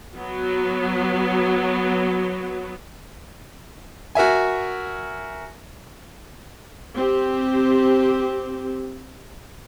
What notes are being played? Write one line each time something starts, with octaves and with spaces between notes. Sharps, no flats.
F#3 B3
F#4 A#4 E5 G#5
C4 G4